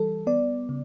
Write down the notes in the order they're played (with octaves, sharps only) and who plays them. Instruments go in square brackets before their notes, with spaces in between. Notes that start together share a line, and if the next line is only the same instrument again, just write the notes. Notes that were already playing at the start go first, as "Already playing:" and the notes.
Already playing: [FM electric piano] E3 G3 A4
B3 D5
C#3